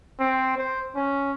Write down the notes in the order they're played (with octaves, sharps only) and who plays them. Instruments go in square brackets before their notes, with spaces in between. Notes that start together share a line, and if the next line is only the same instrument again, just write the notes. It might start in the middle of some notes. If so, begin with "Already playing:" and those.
[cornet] C4
C5
C#4